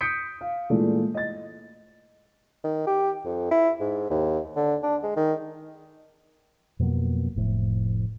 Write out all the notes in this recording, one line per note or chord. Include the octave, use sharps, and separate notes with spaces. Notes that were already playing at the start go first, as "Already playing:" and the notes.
D#6 G6 B6 C#7 D7
F5
A#2 E3 G#3 A3 D4
D#5 A6
D#3
G4
F2
E4
G#2
D#2
D3
D4
G#3
D#3
F2 B2 F#3 A#3
F1 A2 F3